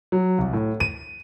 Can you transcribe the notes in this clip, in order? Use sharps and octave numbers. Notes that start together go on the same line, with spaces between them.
F#3
C2
A2
D#7